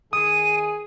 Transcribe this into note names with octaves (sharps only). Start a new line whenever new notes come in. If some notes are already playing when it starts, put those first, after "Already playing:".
D#3 G#4 D#6 D#7